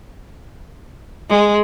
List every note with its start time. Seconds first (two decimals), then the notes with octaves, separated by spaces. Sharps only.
1.29 G#3